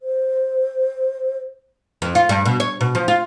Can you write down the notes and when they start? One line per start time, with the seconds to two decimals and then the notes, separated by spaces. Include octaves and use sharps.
0.01 C5
2.02 F2
2.15 F4
2.29 G2
2.46 B2
2.60 C#5
2.81 B2
2.95 F3
3.08 F4